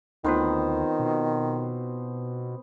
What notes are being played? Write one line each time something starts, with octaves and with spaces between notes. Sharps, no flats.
D2 D#3 B3 C4 D#4 F4 C5
B2